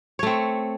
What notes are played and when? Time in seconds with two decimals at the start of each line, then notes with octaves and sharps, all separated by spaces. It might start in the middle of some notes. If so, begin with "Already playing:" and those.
0.19 C#5
0.23 A3
0.27 C4